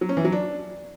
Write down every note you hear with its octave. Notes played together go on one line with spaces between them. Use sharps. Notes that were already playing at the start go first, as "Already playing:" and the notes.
F#3
C#4
E3
F#3
D4